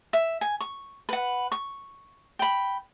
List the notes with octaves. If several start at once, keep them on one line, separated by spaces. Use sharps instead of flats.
E5
G#5
C#6
B4 F#5
C#6
G5 B5